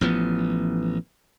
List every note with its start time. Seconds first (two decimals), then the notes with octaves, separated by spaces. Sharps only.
0.01 A1 F3 B3